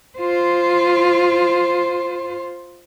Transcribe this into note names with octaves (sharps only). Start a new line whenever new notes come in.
F4 C5